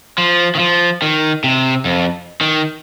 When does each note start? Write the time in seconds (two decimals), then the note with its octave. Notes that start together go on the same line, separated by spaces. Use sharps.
0.18 F3
0.55 D#3
0.59 F3
1.02 D#3
1.44 C3
1.85 F2
2.41 D#3